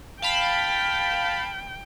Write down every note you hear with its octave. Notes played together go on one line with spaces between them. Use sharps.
F5 G5 A5 B5